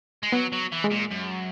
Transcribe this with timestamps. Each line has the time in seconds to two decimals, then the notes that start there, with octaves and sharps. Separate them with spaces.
0.23 G#3
0.32 F#3 B3
0.52 F#3
0.72 E3
0.84 G#3
0.90 A#2
1.11 F#2